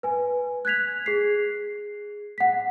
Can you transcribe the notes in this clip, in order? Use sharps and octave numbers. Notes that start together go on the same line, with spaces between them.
B4 G#5
F#6 G#6 B6 F7
G#4 C7
F#5 B6